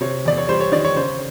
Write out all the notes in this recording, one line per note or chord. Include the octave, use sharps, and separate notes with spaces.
C3 C#5
E2 D5
C#5
G3 C5
C#5
D#3 D5
C#5
C#3 C5